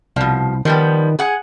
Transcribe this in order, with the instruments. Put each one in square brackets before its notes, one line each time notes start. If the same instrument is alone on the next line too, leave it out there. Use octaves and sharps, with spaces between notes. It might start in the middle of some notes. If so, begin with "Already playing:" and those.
[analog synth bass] C2 [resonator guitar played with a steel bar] B2 F3
[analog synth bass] D#3 [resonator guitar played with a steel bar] F3 G3 B3
[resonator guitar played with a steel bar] G#4 F#5